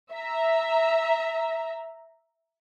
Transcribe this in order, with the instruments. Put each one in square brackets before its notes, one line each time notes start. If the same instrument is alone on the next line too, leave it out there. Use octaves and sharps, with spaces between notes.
[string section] E5 A#5